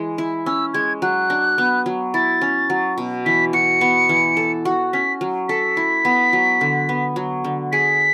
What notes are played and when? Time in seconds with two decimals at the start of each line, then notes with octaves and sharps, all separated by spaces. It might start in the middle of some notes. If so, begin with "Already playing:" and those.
Already playing: E3 G#3
0.18 E4
0.46 C#4 E6
0.74 G#3 G#6
1.02 F#3 F#6
1.30 D4
1.58 B3
1.86 F#3
2.14 E4 A6
2.41 C#4
2.70 F#3
2.98 B2
3.26 E3 B6
3.53 F#4 C#7
3.81 B3
4.09 E3
4.37 A4
4.65 F#4
4.93 C#4 B6
5.21 F#3
5.49 A4 B6
5.77 E4
6.05 B3
6.33 F#3
6.61 D3
6.89 B3
7.16 F#3
7.44 D3
7.72 G#4 B6